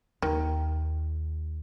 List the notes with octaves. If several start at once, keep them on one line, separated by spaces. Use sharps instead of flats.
D#2 D#3